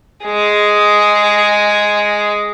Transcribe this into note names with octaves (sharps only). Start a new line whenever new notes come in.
G#3 G#4